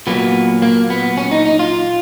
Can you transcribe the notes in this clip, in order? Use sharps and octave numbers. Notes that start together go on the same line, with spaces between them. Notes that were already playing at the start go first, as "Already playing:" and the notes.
A#2 F#3 A#3 B3
A#3
B3
C#4
D#4
D#4
F4